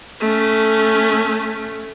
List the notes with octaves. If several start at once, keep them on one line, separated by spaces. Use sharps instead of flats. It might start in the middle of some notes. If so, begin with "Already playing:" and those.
A3 C#4